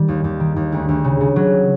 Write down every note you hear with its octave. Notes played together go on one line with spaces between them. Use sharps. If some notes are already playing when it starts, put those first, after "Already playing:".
Already playing: D#3 G3
D#2
D#2
D#3
D#2
D2
D2
C#3
C#3
F#3